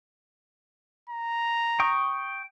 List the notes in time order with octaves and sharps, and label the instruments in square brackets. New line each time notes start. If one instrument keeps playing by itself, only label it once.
[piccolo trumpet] A#5
[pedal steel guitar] G5 C#6 D#6